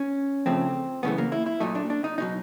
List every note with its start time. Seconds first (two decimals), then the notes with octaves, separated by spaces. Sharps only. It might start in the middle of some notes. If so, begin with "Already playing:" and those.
Already playing: C#4
0.46 F2 C#3 F3 A3 C4
1.03 F#2 C#3 E3 A3 B3
1.18 A#3
1.32 E4
1.46 E4
1.60 A#2 F#3 A3 D#4
1.75 D4
1.90 D4
2.04 D#4
2.18 B2 F#3 D#4